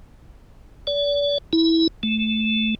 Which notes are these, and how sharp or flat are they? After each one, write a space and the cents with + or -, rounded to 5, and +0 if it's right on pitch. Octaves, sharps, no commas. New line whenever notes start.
D5 -40
E4 -15
A3 -10